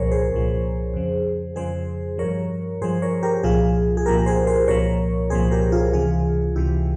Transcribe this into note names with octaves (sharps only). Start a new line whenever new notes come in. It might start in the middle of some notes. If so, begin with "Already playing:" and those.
Already playing: C2 A#2 F3 G#4 A#4 C5 C#5
G#4 C5
C2 A#2 F3
F2 C#3 F3
F2 C#3 F3 G#4 C5
G2 F3 A#4 C#5
G2 F3 G#4 C5
A#4 C#5
G4 A#4
C2 A#2 F3 F4 G#4
G#4
C2 A#2 F3 G4 A#4
G#4 C5
G#4 C5
C2 A#2 F3 A#4 C#5
C2 A#2 F3 G#4 C5
G4 A#4
F4 G#4
C#2 C3 E3 F4 G#4
C#2 C3 E3 E4 G4